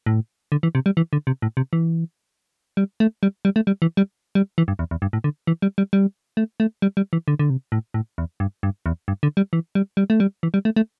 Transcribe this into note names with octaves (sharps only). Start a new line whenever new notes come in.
A2
D3
E3
C3
G3
E3
D3
C3
A2
C3
E3
G3
A3
G3
G3
A3
G3
E3
G3
G3
E3
G2
E2
E2
G2
A2
D3
E3
G3
G3
G3
A3
A3
G3
G3
E3
D3
D3
C3
A2
A2
E2
G2
G2
E2
G2
D3
G3
E3
G3
G3
A3
G3
E3
G3
A3
A3